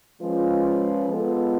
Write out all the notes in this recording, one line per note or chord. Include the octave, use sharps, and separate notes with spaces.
F3 G#3 C#4 F4 B4
G#3 B3 F4 A4